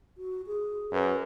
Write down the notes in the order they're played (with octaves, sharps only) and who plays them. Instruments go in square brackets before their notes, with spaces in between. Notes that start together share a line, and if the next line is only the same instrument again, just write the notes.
[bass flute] F#4
G#4
[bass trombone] F#2 [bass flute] B4